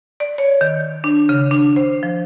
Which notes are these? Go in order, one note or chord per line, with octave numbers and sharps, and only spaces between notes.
D5
C#5
D#3
D4
C#3
D4
C5
F3